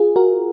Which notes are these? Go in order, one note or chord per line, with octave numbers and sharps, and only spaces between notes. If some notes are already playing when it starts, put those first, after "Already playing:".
Already playing: F4 G#4
F#4 A#4